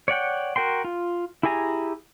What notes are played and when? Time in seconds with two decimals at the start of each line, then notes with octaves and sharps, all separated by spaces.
0.08 C#5 D5 F#5 G5
0.56 F#4 A#4 G5 C6
0.85 F4
1.43 E4 G4 G#4 G#5 A#5